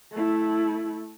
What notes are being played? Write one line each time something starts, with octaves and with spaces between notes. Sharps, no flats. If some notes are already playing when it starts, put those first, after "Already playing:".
A3 E4